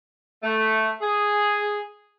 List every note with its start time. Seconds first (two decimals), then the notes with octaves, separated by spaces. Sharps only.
0.43 A3
1.01 G#4